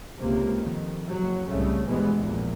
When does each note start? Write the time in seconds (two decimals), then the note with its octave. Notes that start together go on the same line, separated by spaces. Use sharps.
0.19 C#2 C3 A#3
0.60 F2 D#3
1.10 F#1 F#3
1.50 C2 A2 C#3 A3
1.85 D2 G2 B2 E3 G#3 B3
2.16 A#1 E2 A#2